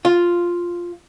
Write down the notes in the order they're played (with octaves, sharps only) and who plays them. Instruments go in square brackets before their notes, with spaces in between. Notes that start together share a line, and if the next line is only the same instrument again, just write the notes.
[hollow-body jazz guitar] F4